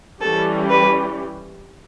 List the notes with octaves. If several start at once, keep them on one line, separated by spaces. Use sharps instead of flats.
E3 G3 C#4 G4 A4
B4